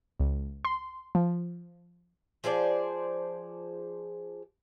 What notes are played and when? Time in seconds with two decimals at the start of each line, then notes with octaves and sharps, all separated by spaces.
0.20 C#2
0.65 C6
1.15 F3
2.44 F3 G#4 C5 D5